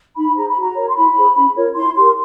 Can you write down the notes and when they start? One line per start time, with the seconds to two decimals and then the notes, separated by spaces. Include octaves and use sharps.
0.16 D#4 B5
0.36 G#4 C5 A#5
0.48 B5
0.56 F#4 A#5
0.76 A#4 C#5
0.88 C6
0.96 E4 B5
1.16 G#4 C5
1.36 C#4
1.56 F4 A#4 C#5
1.76 E4 C6
1.96 G4 A#4 C6